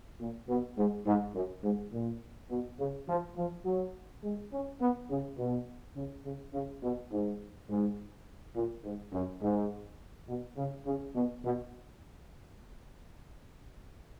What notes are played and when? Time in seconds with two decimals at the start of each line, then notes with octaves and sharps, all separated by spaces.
0.20 A#2
0.49 B2
0.78 G#2
1.06 G#2
1.35 F#2
1.64 G#2
1.93 A#2
2.51 B2
2.80 C#3
3.09 F3
3.37 F3
3.66 F#3
4.24 G#3
4.53 C#4
4.82 B3
5.10 C#3
5.39 B2
5.96 C#3
6.26 C#3
6.54 C#3
6.83 B2
7.12 G#2
7.70 G#2
8.56 A#2
8.85 G#2
9.13 F#2
9.42 G#2
10.29 B2
10.57 C#3
10.87 C#3
11.16 B2
11.45 B2